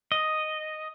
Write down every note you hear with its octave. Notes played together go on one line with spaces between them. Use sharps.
D#5